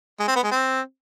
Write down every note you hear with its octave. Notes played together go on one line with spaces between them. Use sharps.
G#3
C4
B3
G#3
C4